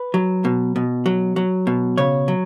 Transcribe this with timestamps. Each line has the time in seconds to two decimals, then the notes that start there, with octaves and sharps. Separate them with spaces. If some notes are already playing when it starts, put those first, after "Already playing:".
Already playing: B4
0.14 F#3
0.45 B2
0.76 B2
1.06 F#3
1.36 F#3
1.67 B2
1.98 C#3 C#5
2.28 F#3